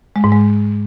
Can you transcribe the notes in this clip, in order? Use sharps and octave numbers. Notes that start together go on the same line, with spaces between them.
G#3
G#2
G#3